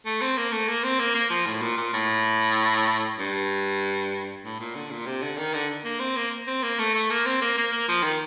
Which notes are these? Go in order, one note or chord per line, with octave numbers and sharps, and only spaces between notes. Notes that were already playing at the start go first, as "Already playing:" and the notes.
A3
C4
A#3
A3
A#3
C4
A#3
A#3
F3
A2
A#2
A#2
A2
G2
A2
A#2
D3
A#2
C3
D3
D#3
D3
A#3
C4
A#3
C4
A#3
A3
A3
A#3
C4
A#3
A#3
A#3
F3
D#3